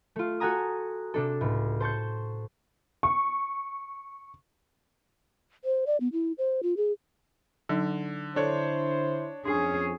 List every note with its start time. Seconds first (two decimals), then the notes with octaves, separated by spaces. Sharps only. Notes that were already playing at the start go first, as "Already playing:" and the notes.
0.16 A3 F4
0.40 F#4 A4 F#5 G#5 A#5 D#6
1.14 C3 D4 A4
1.41 C#2 A2
1.80 C5 A5 C#6 G6
3.03 C#6
5.65 C5
5.87 D5
6.00 B3
6.13 E4
6.38 C5
6.63 F4
6.77 G#4
7.69 D3 F#3 D#4
8.36 D3 D4 E4 A4 C5 C#5
9.45 F2 C#4 D4 G#4